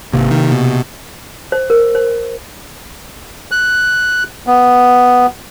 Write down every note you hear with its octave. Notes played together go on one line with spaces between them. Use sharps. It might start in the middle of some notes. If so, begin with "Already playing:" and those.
G#1 C3 A#3
D#3
B2
C5
A#4
C5
F#6
B3